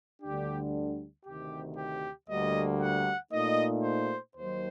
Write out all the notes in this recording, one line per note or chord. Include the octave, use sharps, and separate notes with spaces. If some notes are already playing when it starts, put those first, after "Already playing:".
D2 D3 G3 D4 G4
D2 C3 D#3 G4
G4
D2 D3 G3 A#3 D#5
F#5
A#2 A3 D#4 D#5
C5
D#2 D#3 F#3 C5